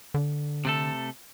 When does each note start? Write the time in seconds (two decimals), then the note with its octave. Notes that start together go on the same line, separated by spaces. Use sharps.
0.14 D3
0.65 C3 A3 A4